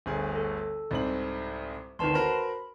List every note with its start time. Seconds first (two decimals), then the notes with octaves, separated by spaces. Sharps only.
0.06 G1 D2 G#4
0.35 A4
0.91 C2 G#2 F#7
1.99 G#1 D2 D#3 B4 A5 C6
2.14 F#4 A#4 C5 B5